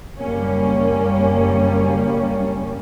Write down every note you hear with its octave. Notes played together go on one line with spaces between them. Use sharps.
F#1 G3 A#3 C#4